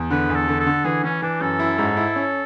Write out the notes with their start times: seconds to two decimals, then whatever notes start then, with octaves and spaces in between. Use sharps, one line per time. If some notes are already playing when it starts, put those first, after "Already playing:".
Already playing: E2
0.10 D3 B4
0.29 E2
0.35 A4
0.48 D3
0.60 A4
0.66 D3
0.85 E3 G#4
1.03 E3 C#4
1.22 E3 D4
1.41 F#2 A4
1.59 E4
1.78 G#2
1.97 E4
2.16 C#4